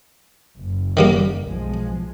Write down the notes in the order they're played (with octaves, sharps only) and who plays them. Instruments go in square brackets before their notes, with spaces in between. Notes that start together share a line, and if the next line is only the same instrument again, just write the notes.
[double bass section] F#1
[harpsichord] D#3 G3 A#3
[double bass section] B1 F3 G#3